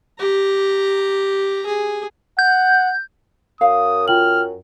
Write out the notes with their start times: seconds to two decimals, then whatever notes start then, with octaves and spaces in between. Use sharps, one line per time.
0.19 G4 A#5
1.66 G#4
2.39 F#5 G6
3.61 F#2 F5 D#6
4.08 F4 G5 F6 F#7